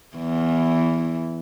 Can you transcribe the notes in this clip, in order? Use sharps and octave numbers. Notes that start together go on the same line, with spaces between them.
E2 E3